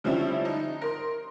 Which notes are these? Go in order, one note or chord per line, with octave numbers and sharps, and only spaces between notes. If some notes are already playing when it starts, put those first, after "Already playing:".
D3 F3 G3 C4 C#4 E4
D#4
A#4 C6